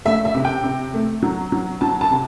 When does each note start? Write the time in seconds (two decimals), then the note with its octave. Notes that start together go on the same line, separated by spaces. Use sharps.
0.05 A3 E5
0.25 E5
0.35 C3
0.45 G5
0.64 C3
0.94 A3
1.22 F#3
1.52 F#3
1.81 F#3 A5
2.01 A5
2.11 C3